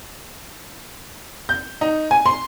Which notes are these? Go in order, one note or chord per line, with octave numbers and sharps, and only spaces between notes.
G6
D#4
G#5
C6